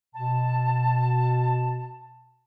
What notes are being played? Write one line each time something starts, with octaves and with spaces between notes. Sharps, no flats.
B2 A5